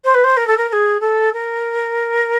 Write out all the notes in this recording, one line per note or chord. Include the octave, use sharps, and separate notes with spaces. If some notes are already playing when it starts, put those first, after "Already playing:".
C5
B4
C5
A#4
A4
A#4
A#4
G#4
A4
A#4